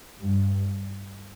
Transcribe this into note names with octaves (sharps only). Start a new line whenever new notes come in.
G2